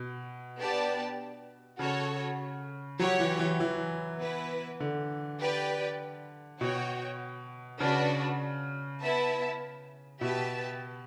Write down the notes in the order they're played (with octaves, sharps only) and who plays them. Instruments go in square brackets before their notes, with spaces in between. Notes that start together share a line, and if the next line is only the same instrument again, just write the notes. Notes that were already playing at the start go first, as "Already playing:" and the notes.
Already playing: [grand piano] B2
[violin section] B3 D4 G4 D5 A5
[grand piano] C#3 [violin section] F#4 A4 C#5
[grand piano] F#3 [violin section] G4 C#5 F#5
[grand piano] E3
E3
E3
[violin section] B3 E4 B4
[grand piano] D3
[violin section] G4 B4 D5 G5
[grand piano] B2 [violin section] F#4 C#5 G5
[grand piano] C#3 [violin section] D4 F#4 B4
[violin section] B3 E4 B4 E5 A5
[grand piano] B2 [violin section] G4 B4 E5 A5